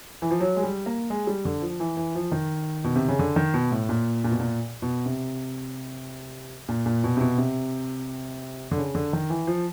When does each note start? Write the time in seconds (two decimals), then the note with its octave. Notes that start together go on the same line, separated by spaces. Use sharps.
0.22 E3
0.31 F3
0.40 F#3
0.56 G#3
0.63 G3
0.86 A#3
1.10 G#3
1.27 G3
1.45 D3
1.62 F3
1.80 E3
1.97 E3
2.15 F3
2.32 D#3
2.84 B2
2.95 C3
3.08 C#3
3.19 D3
3.36 D#3
3.54 B2
3.71 A2
3.89 A#2
4.24 A#2
4.31 B2
4.39 A#2
4.82 B2
5.06 C3
6.69 A#2
6.86 A#2
7.04 B2
7.17 C3
7.21 B2
7.38 C3
8.71 D3
8.78 C#3
8.95 D3
9.13 D#3
9.30 E3
9.47 F3